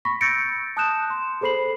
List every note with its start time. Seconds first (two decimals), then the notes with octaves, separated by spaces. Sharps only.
0.05 B5 C#6 A#6 B6
0.21 E6 G6 A6 A#6 C#7 D7
0.77 A5 D#6 F#6 G6 E7
1.10 C6
1.41 G#4 A4 C5 B5 C7 F#7